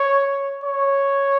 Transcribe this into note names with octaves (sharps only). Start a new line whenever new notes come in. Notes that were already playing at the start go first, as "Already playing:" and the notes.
Already playing: C#5
C#5